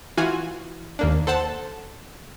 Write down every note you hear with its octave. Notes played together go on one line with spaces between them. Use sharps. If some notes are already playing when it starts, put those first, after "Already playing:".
E3 F4 F#4 G#5
D#2 A#3 D4
A4 C5 F#5 A5